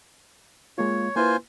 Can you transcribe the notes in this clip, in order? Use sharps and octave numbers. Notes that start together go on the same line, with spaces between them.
G#3 A#3 F4 C#5
A#3 E4 F4 B4 C5 G#5